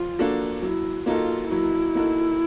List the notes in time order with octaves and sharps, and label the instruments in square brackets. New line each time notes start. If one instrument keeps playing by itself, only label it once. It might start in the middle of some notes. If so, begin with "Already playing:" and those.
Already playing: [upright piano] F3 [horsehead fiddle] F4
[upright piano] A#3 D4 F#4 A4
[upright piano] F#3 [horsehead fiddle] E4
[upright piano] A#3 D#4 F#4 A4 [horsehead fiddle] F4
[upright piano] F#3 [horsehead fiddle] E4
[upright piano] A#3 D#4 F#4 A4